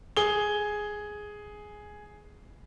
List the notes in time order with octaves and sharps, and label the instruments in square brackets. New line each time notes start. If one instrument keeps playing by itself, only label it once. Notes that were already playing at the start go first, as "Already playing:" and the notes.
[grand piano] G#4 G7